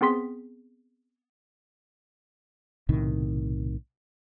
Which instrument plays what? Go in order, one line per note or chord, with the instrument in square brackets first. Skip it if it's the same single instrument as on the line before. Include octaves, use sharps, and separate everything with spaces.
[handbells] B3 C4 G#4 C6 B6
[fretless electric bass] B1 A2 C3 D#3